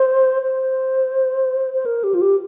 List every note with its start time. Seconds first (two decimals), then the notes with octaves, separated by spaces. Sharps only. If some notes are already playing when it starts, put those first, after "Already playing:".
Already playing: C5
0.42 C5
1.74 C5
1.85 A#4
2.04 G4
2.14 F4
2.21 G4